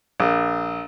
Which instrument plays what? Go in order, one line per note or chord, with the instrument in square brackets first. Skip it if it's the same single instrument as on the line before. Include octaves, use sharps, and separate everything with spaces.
[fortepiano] A#1